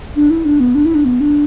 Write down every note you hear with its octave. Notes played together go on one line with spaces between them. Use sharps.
D4
E4
D4
B3
D4
E4
D4
B3
D4